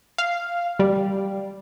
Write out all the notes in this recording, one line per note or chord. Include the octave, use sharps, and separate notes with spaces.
F5
G3